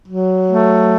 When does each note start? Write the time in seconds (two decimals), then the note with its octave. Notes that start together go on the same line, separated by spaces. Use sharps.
0.09 F#3
0.49 A3